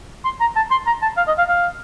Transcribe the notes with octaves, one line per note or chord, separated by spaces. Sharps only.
C6
A#5
A5
C6
A#5
A5
F5
D#5
F5
F5